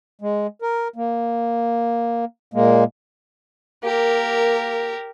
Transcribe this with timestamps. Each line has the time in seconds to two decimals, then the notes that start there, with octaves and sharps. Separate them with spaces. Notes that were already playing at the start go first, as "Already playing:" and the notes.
0.21 G#3
0.62 A#4
0.96 A#3
2.54 A#2 G#3 A#3
3.84 A#3 G4 A#4